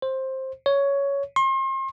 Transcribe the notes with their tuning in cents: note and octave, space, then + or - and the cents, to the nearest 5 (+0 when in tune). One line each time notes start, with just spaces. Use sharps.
C5 +15
C#5 +10
C6 +40